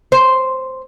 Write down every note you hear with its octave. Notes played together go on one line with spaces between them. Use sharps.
C5